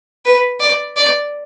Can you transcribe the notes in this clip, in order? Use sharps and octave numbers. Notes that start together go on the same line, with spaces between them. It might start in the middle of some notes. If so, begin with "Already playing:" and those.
B4
D5
D5